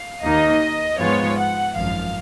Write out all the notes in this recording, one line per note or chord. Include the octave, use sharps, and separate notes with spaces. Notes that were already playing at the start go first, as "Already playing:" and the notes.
Already playing: F5
D#2 D#3 A#3 D#4 D#5
G#2 F3 G#3 B3 F4 C#5
F#5
G#1 F#2 F3 F5